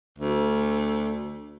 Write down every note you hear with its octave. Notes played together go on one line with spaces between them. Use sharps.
D2